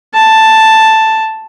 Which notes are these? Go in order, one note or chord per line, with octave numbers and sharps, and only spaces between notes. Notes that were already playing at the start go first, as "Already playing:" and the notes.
A5